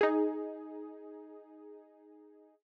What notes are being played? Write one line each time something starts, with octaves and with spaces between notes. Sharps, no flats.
D#4 G#4